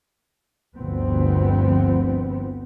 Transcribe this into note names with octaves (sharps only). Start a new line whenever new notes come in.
G1 D2 G2 F3 B3 C4